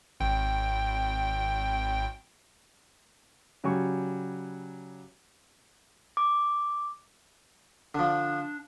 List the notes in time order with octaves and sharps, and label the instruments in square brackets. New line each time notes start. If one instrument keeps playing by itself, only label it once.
[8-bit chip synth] G#1 G5
[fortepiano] C#3 F#3 G3 G#5 C#6
[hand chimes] D6
[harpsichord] D3 F3 [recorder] D4